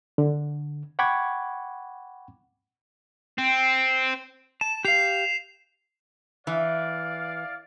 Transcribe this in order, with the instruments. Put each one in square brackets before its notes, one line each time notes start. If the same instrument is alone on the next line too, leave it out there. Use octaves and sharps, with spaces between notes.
[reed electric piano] D3
F#5 G5 B5 C#6 D6 G#6
[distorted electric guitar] C4
[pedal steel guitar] A5 [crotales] E7
[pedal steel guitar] G4 F5 [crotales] C7 F7
[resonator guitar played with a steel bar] E3 [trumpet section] D5 F5